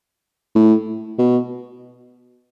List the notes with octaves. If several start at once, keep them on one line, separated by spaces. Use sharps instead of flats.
A2
B2